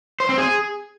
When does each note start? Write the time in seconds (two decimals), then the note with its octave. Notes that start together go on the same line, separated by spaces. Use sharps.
0.20 C5
0.29 C4
0.38 G#4